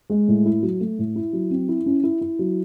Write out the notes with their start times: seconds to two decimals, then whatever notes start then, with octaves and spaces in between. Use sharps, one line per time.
0.10 G#3
0.28 A2
0.45 E4
0.63 F#3
0.80 A3
0.98 A2
1.16 E4
1.33 F#3
1.51 C4
1.69 E4
1.86 C#4
2.04 E4
2.21 E4
2.39 F#3